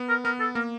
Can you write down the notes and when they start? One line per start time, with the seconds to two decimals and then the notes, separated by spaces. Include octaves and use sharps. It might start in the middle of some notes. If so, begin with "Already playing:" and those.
Already playing: B3
0.09 A#4
0.25 B3 A#4
0.40 A4
0.55 A#3 A#4